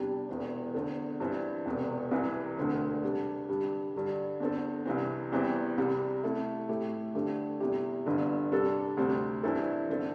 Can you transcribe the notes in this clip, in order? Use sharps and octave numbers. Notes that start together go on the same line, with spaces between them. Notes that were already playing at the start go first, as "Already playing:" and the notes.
Already playing: E2 C3 G3 D4 G4
E1 E2 E3 C4
E2 D3 C4 A4
G2 E3 C4
E1 E2 C3
C2 C3 E3
E1 D2 D3 C4
C3 G3 D4
G2 D3 G3 D4
G2 D3 G3
E2 D3 C4 A4
C2 C3 E3 C4
E2 E3 G3 C4 G4
C2 C3 G3
C3 A3 E4
A2 A3 E4 G4
G2 D3 A3 C4 G4
E2 C3 G3 E4 G4
G1 G2 D3
C3 G3 D4 A4
D2 C3 G3 C4
G2 E3 C4 E4 A4
G1 D3 C4 A4